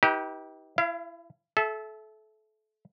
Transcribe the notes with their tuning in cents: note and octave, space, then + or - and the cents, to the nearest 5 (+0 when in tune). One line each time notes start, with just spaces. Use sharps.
D#4 +40 G4 -10 B4 -25
E4 +25 F5 -35
A4 -30 E5 +0